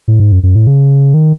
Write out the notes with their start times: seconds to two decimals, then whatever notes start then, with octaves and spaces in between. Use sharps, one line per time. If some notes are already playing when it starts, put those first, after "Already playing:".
0.08 A2
0.20 G#2
0.32 F#2
0.43 F#2
0.55 A2
0.67 C#3
1.14 D#3